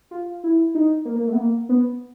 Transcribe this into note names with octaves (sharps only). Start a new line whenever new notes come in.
F4
E4
D#4
A#3
A#3
A3
B3
A#3
B3